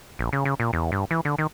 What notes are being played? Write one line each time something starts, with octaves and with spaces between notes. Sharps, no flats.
A#1
C#3
C#3
A#2
E2
G2
E3
D3
D#3